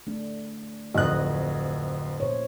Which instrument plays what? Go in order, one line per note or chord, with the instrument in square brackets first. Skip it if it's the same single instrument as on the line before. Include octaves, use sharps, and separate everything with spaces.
[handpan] A3 D4
[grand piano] D1 F2 F#6 [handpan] D#5
[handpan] A#2 C5 C#5